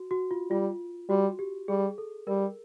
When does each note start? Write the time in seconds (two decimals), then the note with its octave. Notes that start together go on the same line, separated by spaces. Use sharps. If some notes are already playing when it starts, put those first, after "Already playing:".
Already playing: F#4
0.11 F#4
0.31 F4
0.50 G3 F4
1.09 G3 F#4
1.39 G4
1.68 G3 G#4
1.98 A4
2.27 G3 A#4